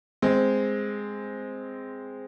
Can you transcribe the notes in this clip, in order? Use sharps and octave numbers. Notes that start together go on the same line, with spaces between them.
G#3 C4